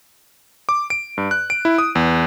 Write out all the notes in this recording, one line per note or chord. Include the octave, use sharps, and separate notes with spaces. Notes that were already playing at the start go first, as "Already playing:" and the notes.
D6
D7
G2
F#6
D7
E4
D#6
E2